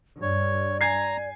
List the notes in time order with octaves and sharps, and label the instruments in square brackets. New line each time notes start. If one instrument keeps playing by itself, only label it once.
[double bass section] G2 [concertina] C#5 [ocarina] D5
[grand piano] G#5 G#6 C7 [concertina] A#5